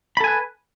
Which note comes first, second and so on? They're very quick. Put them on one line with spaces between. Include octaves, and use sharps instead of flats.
B5 A4 G#5 B4